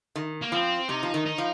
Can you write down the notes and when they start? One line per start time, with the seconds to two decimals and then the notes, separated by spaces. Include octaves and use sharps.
0.16 D#3
0.41 A#3
0.52 F3 C4
0.89 C3 D#4
1.03 F3
1.14 D#3
1.26 D#4
1.38 F3